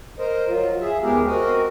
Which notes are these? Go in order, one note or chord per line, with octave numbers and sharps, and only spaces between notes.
A#4 C5 D#5
F#3 F4
G#4 E5
D#2 G#3 B3 G4 G#4 A#4
C4 F#4 A#4 D#5